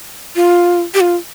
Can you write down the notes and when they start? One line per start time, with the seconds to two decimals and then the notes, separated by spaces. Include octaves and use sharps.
0.35 F4
0.94 G4
1.00 F4